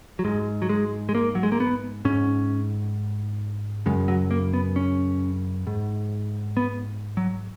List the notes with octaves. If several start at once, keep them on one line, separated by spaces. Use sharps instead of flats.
F#3
G#2 G#3
F#3
G#3
G#3
A#3
F#3
G#3
A#3
B3
G#2 C#4
F#2 C#3 G#3
F#3
A#3
B3
C#4
G#2
B3
F#3